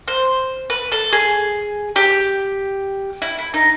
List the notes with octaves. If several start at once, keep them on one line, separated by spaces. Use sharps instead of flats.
C5
B4
A4
G#4
G4
E4
E4
D#4